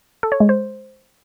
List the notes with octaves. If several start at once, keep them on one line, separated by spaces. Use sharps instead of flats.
A4
C#5
G#3
C5